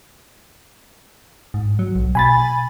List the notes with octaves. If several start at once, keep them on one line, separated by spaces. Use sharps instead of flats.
G#2
F#3
B1
B2 G#5 B5 A6